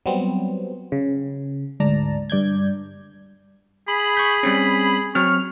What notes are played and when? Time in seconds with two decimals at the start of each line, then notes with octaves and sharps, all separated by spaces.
0.06 F#3 G3 B3 C4
0.92 C#3
1.80 D2 G#2 D5 A5 A#5
2.30 G2 D5 G6 G#6
3.88 G#4 B5
4.17 C#6 G6
4.43 G3 C4 C#4
5.15 F#3 C4 C#6 F6